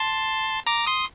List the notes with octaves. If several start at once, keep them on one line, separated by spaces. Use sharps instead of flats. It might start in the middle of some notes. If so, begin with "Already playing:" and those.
Already playing: A5 C6
A#5 D6
C6 D#6